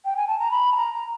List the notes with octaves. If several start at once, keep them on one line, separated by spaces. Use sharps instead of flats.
G5
G#5
A5
A#5
B5
A5
A#5